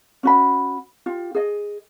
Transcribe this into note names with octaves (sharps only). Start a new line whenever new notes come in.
C#4 F#4 B5
F4 G4
G#4 D#5